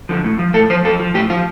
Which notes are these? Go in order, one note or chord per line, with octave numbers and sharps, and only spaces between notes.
D3 F3
A2
F3
A2 A4
F3 C5
F2 A4
F3
A2 G4
F3 F4